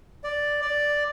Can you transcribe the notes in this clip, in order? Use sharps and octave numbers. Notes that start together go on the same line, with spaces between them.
D5
D5